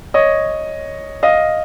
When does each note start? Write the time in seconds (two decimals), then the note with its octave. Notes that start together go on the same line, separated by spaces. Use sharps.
0.14 C#5 D#5
1.23 D#5 F5